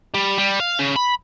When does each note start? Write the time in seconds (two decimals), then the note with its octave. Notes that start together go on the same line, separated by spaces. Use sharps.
0.14 G3
0.38 G3
0.60 F5
0.79 C#3
0.96 B5